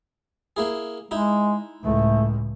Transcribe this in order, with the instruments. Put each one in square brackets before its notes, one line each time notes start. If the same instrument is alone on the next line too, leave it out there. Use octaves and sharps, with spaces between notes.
[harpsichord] A#3 E4 G#4
[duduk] G#3 [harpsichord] D#4 E4
[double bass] C#2 A2 [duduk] A3